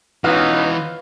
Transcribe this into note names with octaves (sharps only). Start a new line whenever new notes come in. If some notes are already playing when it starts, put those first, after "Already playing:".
E3 B3 C#4 D#4 F4 F#4 B4 F6